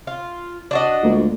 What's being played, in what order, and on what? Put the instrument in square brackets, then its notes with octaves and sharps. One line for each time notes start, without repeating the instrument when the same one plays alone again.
[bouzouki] F4
D4 F#4 D#5
[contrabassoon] D2 [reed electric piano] G#3 A#3 F4